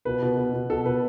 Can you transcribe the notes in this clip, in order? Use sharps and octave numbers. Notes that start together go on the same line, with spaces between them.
B2 B4
B2
B2
B2
B2 A4
B2 B4